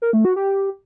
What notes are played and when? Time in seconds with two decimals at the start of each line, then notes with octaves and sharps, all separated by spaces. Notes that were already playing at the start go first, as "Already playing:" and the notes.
0.02 A#4
0.13 A3
0.25 F#4
0.36 G4